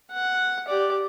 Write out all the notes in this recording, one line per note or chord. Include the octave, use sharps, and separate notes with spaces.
F#5
G4 D5